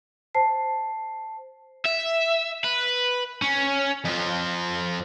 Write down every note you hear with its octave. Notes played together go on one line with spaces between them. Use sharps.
C5 A5 C7
E5
B4
C#4
F2 F3